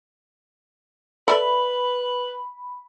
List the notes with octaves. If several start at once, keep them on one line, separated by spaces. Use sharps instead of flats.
A4 B4 D5 E5 B5